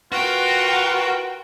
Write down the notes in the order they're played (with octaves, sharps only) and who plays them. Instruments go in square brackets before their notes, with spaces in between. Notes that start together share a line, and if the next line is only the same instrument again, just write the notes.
[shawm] F4 [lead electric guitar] F#4 [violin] A#4 G5 [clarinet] B4